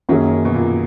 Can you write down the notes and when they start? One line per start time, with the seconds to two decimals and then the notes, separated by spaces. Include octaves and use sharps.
0.09 F#2 D#3 F#3 A#3 C#4 G#4
0.45 B2
0.54 A#2